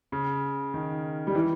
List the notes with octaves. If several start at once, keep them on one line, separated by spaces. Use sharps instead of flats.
C#3
D#3
G3
E3